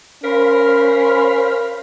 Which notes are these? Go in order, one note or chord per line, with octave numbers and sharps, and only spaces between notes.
C#4 A#4 C5 F5 B5